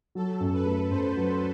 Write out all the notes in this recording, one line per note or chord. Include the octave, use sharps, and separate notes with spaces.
F#3 A4
F#2
B4
A3
F#2 C5
F#3